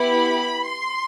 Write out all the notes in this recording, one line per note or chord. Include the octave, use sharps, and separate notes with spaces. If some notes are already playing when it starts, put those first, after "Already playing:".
Already playing: B3 E4 G4 B5
C6